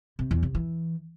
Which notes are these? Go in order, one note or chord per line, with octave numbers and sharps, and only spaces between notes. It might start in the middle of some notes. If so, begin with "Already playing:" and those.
C3
E2
C3
E3